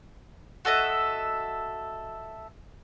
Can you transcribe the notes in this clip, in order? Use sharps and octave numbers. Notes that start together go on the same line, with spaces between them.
F#4 A4 D#5 E5